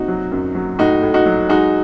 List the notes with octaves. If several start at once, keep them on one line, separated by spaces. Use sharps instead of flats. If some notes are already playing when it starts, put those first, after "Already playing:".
Already playing: C3 D#4 F#4
F#3
F#2
F#3
A2 D#4 F#4
A2
D#4 F#4
F#3
G#3 D#4 F#4